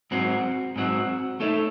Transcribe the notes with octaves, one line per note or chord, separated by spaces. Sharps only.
G#2 F#3 C4 F#4
G#2 F#3 C4 F#4
A3 D#4 A4 C#5 E5